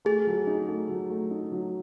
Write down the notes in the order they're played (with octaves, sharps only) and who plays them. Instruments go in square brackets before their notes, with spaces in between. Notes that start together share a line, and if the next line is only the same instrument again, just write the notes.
[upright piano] A3 [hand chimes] G#4
[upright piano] F#3
D#4
A3
F#3
A3
D#4
F#3